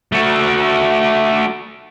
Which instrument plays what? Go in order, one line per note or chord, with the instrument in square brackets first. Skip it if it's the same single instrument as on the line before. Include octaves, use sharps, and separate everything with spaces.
[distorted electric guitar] A3 F#4